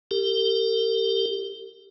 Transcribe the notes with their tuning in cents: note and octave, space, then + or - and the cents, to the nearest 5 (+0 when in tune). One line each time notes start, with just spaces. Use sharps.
G4 +0 A#4 -40